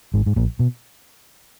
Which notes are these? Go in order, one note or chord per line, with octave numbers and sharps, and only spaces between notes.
G#1 G#2
G#2
A#1 A#2
B2